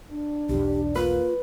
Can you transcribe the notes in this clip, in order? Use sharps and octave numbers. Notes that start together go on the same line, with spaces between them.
D4
B1 E2 G4
A#3 F4 B4